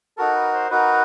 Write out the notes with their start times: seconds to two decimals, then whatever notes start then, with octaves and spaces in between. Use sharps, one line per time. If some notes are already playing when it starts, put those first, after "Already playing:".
0.17 D#4 F#4 A4 A#4
0.35 B4
0.54 C5
0.70 D#4 F#4 A#4 B4